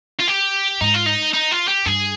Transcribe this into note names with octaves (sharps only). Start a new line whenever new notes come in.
F4
G4
G#2 D#4
F4
D#4
D#4
F4
G4
G2 G#4